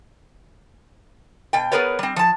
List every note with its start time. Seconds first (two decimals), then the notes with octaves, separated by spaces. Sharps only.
1.53 B2 G5
1.72 B3 G#4 A#4 B4 C#5
1.99 G3 C4
2.16 F3 A5